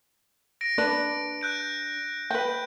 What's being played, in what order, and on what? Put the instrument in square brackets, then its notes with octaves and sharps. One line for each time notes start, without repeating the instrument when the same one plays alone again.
[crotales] A#6 D7
[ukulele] D4 B4 D5
[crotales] F#6 G6 D7
[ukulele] B4 G5 [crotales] G6